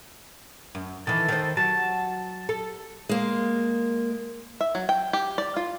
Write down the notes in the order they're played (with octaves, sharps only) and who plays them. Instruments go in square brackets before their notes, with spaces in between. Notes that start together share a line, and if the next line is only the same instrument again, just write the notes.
[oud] F#2
[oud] D#3 E3 [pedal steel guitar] A4
[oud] D#3 C5
[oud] F#3 [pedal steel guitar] A5
[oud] A4
[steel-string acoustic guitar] G#3 A#3
[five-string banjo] E5
F#3
G5
G4
D5
F4